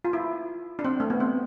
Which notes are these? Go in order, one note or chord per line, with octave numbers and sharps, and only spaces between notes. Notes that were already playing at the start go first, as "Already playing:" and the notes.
F4
E4
D4
C4
A3
B3
C4